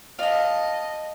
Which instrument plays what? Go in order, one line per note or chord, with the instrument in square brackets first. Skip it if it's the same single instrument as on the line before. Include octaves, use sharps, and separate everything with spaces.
[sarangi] D#5 [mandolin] F5 A5